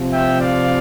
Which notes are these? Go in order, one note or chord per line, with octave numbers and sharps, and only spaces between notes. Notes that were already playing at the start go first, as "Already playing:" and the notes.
Already playing: C3 F3
E5 G5
D5 F5